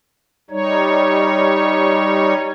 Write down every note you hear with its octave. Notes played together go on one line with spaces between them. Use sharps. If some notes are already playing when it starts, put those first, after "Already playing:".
G3 D#4 C#5